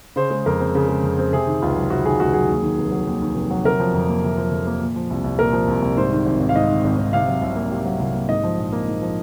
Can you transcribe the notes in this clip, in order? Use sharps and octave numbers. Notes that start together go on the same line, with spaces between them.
C#3 C5
G#3
F2 A#4
C4
C#3
G#3
F2
C4
C3 G#4
D#3
C#2 F4
F#3
C3 F#4
D#3 G#4
C#2 F#4
F#3 G#4
D#2
D#3
F1
F#3
D#2
D#3
F1
F#3
C3 A#4
F3
F2
A#3
C3
F3
F2
A#3
A#2
F3
C2
C2
A#2 A#4
F3
C2
C2
G#2 C5
D#3
G#1
G#1
F5
G#2 D#5
D#3
G#1
G#1
C3 F5
F#3
C2
A#3
C3
F#3
C2
A#3
G#2 D#5
F3
A#1
A#3
G#2
F3